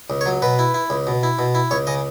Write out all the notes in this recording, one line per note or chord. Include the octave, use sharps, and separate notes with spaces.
C#2
C#5
F#3
B2 B4
E4
E4
C#2
B2
E4
B2
E4
C#2 C#5
C#3 D#5